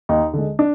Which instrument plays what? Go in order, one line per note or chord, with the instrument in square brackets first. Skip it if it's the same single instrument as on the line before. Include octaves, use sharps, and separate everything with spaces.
[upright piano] D#2 D#4
D3 G#3
D4